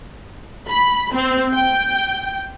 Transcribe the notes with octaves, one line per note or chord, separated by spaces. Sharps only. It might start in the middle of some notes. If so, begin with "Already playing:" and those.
B5
C4
G5